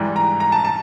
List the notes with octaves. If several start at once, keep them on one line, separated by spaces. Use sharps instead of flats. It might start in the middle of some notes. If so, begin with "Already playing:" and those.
Already playing: G#2 E3 G3
A#5
A#5
A5
A5